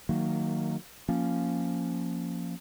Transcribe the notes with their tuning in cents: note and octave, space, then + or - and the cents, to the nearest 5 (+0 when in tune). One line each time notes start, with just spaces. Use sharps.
D#3 +0 F#3 -10 A#3 -25
F3 +0 A#3 +0 C#4 +0